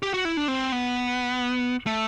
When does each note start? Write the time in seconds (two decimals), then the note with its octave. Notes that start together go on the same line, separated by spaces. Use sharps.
0.03 G4
0.14 F#4
0.25 E4
0.37 D4
0.48 C4
0.72 B3
1.86 A3